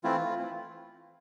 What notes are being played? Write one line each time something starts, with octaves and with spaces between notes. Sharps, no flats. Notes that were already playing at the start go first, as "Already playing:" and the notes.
E3 A3 C4 E4 F4
E3 A3 C4 E4